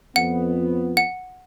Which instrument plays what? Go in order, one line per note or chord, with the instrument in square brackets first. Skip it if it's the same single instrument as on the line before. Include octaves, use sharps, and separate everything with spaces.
[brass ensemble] F2 B3 [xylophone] F#5
[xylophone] F#5